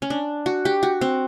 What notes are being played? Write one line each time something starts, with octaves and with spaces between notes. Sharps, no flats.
C#4
D4
F#4
G4
F#4
C4